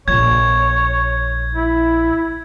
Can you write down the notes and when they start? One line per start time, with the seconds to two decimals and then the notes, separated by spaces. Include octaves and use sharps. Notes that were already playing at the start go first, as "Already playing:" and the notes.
0.08 A#1 F3 C#5 G#6
1.55 E4